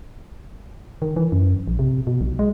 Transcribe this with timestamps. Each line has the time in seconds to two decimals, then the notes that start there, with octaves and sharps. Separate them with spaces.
1.02 D#3
1.16 E3
1.32 F#2
1.68 A#1
1.79 C3
2.07 B2
2.21 B1
2.39 G#3